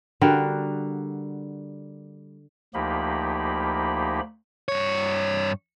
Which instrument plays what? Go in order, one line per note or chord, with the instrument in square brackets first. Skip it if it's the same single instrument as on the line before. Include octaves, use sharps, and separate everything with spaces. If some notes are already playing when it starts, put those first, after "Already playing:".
[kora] D3 G3 F#4 A#4
[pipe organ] D2 F3 A#3 D#4 G4 B5
[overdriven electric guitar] G2 C#5